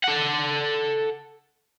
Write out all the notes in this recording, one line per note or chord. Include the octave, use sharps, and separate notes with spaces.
A4 F#5